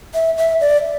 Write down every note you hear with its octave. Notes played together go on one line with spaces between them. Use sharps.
E5
E5
D5